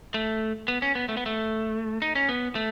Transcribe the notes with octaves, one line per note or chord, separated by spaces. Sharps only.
A3
B3
C#4
B3
A3
B3
A3
D#4
C#4
B3
A3